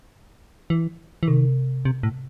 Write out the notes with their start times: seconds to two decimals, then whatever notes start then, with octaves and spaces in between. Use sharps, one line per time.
0.70 E3
1.23 E3
1.28 C3 D#3
1.85 C3
2.03 A2